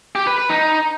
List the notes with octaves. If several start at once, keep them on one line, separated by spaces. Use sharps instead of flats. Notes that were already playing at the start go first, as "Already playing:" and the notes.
G4
B4
B4
D#4